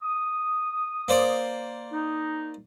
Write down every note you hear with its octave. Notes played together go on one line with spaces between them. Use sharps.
D#6
A#3 C5 D5
D#4